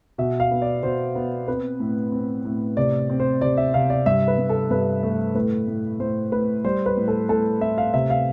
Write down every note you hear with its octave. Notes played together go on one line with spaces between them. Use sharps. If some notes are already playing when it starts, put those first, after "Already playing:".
B2 E5
F5
B3
D5
B2 C5
B3
C4 B4
A2
C4
A2
C3 D5
C4
C5
C3 D5
E5
C3 F5
D5
G2 E5
B4
G2
A4
G2 B4
A3
A2 B4
A2
A2 C5
A2 B4
G3 C5
B4
A2
A4
A2 A4
A2 E5
F5
C3 E5
F5